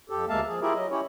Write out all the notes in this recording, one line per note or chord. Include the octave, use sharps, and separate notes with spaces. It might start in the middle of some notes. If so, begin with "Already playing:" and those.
F2 G4 A4
D2 G#3 A#3 E5 F5 A5
F3 G#4
E4 F4 G4 G#4 A#4 E5
F#3 D#5
C#4 E4 G4 C#5